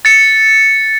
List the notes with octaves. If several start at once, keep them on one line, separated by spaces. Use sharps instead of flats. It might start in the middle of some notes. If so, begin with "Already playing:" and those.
A6 C#7